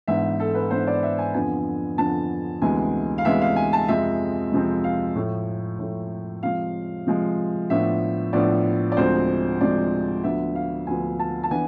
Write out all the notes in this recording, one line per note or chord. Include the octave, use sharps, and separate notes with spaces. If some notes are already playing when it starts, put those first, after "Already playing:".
G#2 E3 B3 D4 E5
A4
B4
G#2 E3 B3 D4 C5
D5
E5
G#5
F2 D3 F3 B3 D4 G#5
F2 D3 F3 B3 D4 A5
D2 C3 E3 G#3 B3 G#5
F5
D2 C3 E3 G#3 B3 E5
F5
G#5
A5
F2 C3 F3 G#3 C4 E5
F2 C3 F3 G#3 C4
F5
A2 F3 A3
A2 F3 A3
C3 F3 G#3 F5
C3 F3 G#3
A2 F3 B3 D4 E5
A2 F3 B3 D4 D5
D5
D2 C3 F3 G#3 C4 C5
D2 C3 F3 G#3 C4 D5
D2 D3 F3 B3 E5
F5
D2 D3 F3 B3 G#5
A5
A5
E3 B3 D4 G#5